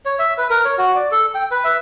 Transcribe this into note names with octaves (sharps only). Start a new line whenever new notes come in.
C#5
E5
B4
A#4
C#5
F#4
D5
A4
G5
B4
E5